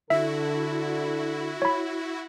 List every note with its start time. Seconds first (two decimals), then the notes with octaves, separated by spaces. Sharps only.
0.10 D3 E4 F#4 A4 E5
1.62 C#5 B5